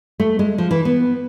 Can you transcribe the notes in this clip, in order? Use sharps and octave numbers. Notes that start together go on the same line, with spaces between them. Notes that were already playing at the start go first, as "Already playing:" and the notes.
A3
G#3
F3
E3
B3